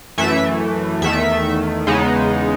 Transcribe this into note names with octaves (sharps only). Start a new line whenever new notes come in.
F#2 E3 A3 E5
E2 D#3 A3 E5
E2 C#3 G#3 B3 D#4